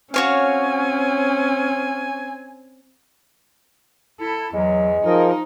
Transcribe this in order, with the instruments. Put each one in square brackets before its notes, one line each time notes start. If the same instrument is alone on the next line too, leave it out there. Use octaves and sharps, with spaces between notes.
[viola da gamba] C4 [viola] C#4 [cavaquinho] F#4 C#5 F5 [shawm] G#5
[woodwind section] E4 [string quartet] A4
[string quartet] E2 [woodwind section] F#3 [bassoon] G#3
[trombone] F3 [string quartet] D#4 [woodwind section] G#4 A#4